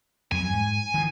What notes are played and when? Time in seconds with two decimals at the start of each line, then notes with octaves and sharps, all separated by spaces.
0.32 F2 F#3 G#5
0.53 G#2
0.94 D#3 F3